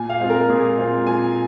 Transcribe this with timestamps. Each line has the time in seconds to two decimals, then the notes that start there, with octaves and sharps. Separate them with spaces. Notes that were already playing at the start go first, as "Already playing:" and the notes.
Already playing: A#2 G#5
0.10 F5
0.20 G#3 C4 F4
0.30 A#4
0.49 A#2 G#4
0.78 G#3 C4 F4
1.07 A#2 G#5